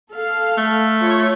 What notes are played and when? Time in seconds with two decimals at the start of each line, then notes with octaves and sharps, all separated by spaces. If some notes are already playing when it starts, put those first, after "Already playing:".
0.13 A4 F5
0.58 A3
1.00 F4 C#5